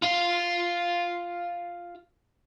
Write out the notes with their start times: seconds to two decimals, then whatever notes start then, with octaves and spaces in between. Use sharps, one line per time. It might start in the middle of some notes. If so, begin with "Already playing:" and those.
0.03 F4 F5